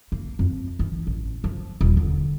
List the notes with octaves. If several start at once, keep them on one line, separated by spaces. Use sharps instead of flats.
A#3
F2
E3
A1
F3
D#1
D3